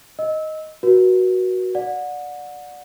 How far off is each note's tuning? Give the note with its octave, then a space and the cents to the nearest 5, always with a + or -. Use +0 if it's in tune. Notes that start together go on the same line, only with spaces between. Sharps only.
D#5 +5 E6 -20
F#4 +0 B4 -45
D5 +0 F#5 -25